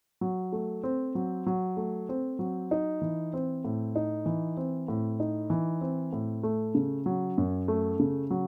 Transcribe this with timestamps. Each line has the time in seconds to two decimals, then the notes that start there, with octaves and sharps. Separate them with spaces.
0.21 F#3
0.52 A3
0.83 C4
1.15 F#3
1.47 F#3
1.77 A3
2.09 C4
2.39 F#3
2.71 D#4
3.02 E3
3.33 C4
3.65 A2
3.96 D#4
4.26 E3
4.57 C4
4.88 A2
5.20 D#4
5.50 E3
5.81 C4
6.13 A2
6.43 A3
6.75 C#3
7.06 F#3
7.38 F#2
7.68 A3
7.99 C#3
8.30 F#3